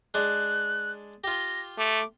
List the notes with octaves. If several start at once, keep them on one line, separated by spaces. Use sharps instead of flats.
G#3 D4 F#6
F4 G4 A#6
A3 D6